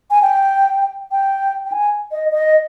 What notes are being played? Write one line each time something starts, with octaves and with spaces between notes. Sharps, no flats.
G#5
G5
G5
G5
G#5
D#5
D#5